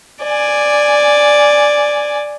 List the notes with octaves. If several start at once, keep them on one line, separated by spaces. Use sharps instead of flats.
D5 G#5